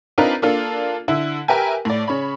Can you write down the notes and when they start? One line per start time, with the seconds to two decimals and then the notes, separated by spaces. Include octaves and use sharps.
0.18 C4 D4 D#4 F4 A#4 B4
0.42 A#3 D4 F4 A4
1.08 D3 E4
1.48 G4 A#4 B4 E5 G5 G#5
1.85 A2 D5
2.08 C#3 C#5 B5